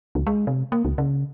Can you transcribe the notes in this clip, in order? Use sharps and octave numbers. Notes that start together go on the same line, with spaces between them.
C#2
G#3
C3
A#3
C#2
C#3